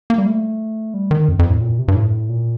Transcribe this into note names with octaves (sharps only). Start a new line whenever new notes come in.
A#3
G3
A3
G3
D#3
F2
F2
A2
A#2
C3
G2
A2
A#2